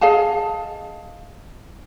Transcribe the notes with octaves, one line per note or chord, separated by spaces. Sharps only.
G#4 D#5 F5 A5